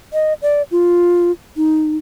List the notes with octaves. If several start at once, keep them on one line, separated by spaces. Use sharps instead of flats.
D#5
D5
F4
D#4